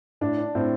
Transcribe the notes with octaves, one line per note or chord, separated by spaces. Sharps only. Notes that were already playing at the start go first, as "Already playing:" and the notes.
A2 D4
D4
A2 C4